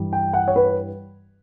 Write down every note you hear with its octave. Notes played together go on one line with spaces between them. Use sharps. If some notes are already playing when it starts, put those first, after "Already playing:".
Already playing: G2 E3 G3
G5
F#5
C#5
B4